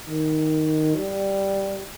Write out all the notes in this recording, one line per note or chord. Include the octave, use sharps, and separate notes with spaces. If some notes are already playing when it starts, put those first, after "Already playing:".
D#3
G3